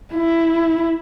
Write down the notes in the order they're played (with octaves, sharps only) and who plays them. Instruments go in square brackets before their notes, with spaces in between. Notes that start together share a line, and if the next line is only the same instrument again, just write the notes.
[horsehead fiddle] E4